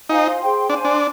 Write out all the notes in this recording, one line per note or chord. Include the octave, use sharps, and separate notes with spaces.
D#4 F4 C5 F5 G#5
G#4 C5 G5 C6
D4 C5 F5 G#5 C6
D4